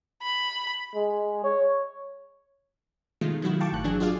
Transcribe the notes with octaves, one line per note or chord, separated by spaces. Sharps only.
B5
G#3
C#5
B2 D#3 G#3 A3 F4
D#3 F#3 E4 F#4
F5 G5 A5 C#6 D6
G1 A2 F#6
E3 F#3 D4 G#4
F4 F#4 G#4 D5 F5